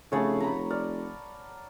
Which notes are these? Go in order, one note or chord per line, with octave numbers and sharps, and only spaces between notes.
F1 C#3 A3 G#4 C#5 F#5 A5
A#5 B5
D5 F6